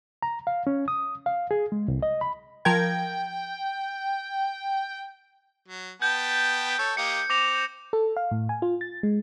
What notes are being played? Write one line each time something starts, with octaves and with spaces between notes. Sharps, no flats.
A#5
F5
C#4
D#6
F5
G#4
G#3
C2
D#5
B5
F3 A#4 G5 G#6
F#3
B3 G5 A5 G6
A4 C#5
A#3 G4 D#5 C#7
C4 D6 A#6 F7
A4
F5
A2
G#5
F4
A6
G#3